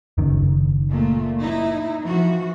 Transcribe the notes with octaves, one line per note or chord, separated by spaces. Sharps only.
F#1 F#2 D#3
A#2 A3
D#4 E4
E3 F3 F#4